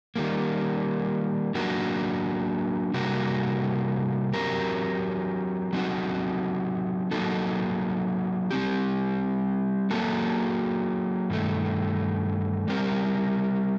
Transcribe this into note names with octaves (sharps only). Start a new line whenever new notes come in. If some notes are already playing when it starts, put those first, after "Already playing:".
D#3 G3 A#3
F#3 A#3 D4 F#4 A#4
C3 G3 A#3 F#4 A#4
F#3 C4 G4 A#4
F#3 C4 D#4 F#4
F#3 A#3 D#4 F#4 A4
G3 C4 G4
F#3 A#3 F#4 A4
G2 D#3 A3
G3 C4 G4 A#4